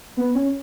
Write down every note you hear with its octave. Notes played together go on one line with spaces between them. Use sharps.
B3
C#4